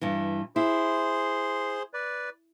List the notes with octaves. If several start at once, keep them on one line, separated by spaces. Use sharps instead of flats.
G2 E3
E4 G#4 C5 C6
B4 D5